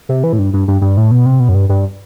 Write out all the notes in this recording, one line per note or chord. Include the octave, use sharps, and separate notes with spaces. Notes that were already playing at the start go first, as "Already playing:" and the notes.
C3
E3
A2
G2
G2
G2
G2
A2
B2
C3
B2
F#2
G2
G2